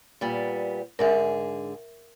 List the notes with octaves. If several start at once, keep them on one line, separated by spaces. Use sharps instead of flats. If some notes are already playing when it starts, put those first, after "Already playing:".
A#2 G3 B3
G#2 D3 G#4 A#4 E5